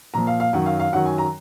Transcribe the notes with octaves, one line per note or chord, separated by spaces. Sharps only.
A#2 F3 A#5
F5
F5
F#2 D#3 F#3 F#5
F5
F5
F#2 D#3 F#3 F#5
G#5
A#5